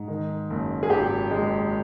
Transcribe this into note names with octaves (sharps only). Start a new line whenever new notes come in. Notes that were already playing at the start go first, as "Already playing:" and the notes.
Already playing: G#2
D#3
F#1
G#4
G#1 G4
G#3